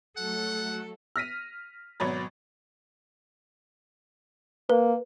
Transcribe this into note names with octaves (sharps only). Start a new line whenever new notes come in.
F#3 A3 A4 F#5
F6 A#6 B6 D#7
G#1 B2 F#3 C#5 B5 A6
A#3 B4